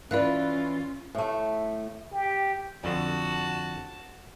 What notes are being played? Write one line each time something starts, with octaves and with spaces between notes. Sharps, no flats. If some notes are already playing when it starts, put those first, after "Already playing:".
E3 C#4 F4 B4 D5 F5 F#6
A2 A3
G4
F2 D3 F#4 A5